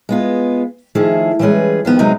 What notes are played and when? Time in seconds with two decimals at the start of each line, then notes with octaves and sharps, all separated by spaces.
0.09 G#3 B3 F4
0.95 D#3 F3 A3 E4 G#4
1.39 E3 G3 G#3 C#4 G#4 B4
1.85 D#3 F3 B3
1.99 F#2 C3 F#3 G#3 D#4 B4